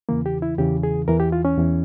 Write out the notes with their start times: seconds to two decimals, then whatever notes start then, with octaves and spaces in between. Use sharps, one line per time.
0.09 E2 C#3 E3 A#3
0.26 G4
0.42 E4
0.58 E2 C#3 E3 G4
0.83 G#4
1.08 E2 E3 A#4
1.20 G4
1.32 F4
1.45 C#4
1.58 E2 E3